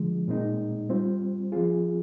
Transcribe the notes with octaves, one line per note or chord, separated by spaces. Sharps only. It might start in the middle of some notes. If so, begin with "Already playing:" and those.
Already playing: D3 F3 G#3
A#2 G#3 C4 D#4
G3 C4 F4 C5
F3 C4 F4 G#4